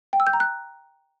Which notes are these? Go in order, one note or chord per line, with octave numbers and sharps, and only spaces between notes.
G5
E6
G6
A#5
F#6